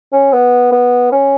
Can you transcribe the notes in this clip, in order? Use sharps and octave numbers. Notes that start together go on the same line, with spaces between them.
C#4
B3
B3
C#4